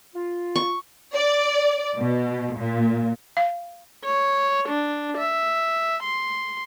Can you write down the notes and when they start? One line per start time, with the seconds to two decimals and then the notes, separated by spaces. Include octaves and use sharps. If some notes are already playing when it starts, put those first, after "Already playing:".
0.15 F4
0.56 C#6
1.14 D5
1.99 B2
2.57 A#2
3.37 F5
4.05 C#5
4.69 D4
5.18 E5
6.04 C6